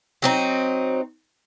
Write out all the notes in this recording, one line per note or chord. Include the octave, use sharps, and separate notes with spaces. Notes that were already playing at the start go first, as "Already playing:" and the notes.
F#3 C4 D#4